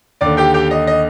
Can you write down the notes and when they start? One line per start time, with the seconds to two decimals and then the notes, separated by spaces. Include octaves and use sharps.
0.21 D#2 D3 D5 D6
0.37 G4 G5
0.54 G4 G5
0.71 D#5
0.87 D#5